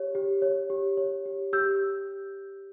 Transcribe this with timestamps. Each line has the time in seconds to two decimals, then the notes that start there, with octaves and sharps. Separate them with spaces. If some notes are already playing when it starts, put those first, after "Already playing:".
Already playing: G4 C#5
0.15 G4
0.42 C#5
0.70 G4
0.97 C#5
1.26 G4
1.53 G4 E6 G6